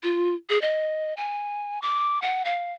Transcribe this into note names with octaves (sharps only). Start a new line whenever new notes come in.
F4
G#4
D#5
G#5
D6
F#5
F5